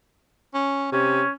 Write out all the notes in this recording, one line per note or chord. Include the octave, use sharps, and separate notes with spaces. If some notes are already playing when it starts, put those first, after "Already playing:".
C#4
C3 C#4